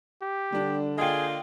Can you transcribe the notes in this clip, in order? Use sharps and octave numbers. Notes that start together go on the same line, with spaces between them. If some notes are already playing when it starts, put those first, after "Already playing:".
G4
D3 G3 D4
A#3 D4 F4 G#4 D#5 G5